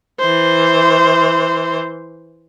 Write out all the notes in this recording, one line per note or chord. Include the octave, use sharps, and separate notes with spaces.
E3 C5